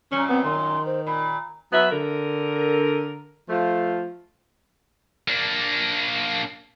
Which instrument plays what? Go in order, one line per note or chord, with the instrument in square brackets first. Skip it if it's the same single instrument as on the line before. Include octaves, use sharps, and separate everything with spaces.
[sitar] F#2 A#2 [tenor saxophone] C#4
[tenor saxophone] B3 [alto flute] C4
[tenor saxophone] D#3 [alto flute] C6
[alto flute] C5
[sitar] A#2 [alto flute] B5
[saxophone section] F#3 B3 B4 E5
D3 A#4
F3 A3 F4
[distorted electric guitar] A#3 D4